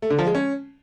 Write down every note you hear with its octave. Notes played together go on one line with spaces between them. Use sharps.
A3
D3
F3
G#3
C#4